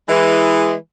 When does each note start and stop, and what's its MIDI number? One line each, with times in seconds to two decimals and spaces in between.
0.07 0.71 52
0.07 0.71 56